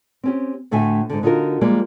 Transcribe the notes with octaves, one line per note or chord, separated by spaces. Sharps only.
C4 C#4 G4
D2 A2 D3 E5 F#5 G#5
G#2 D3
D3 D#4 F4 F#4 A#4
F3 G3 G#3 A#3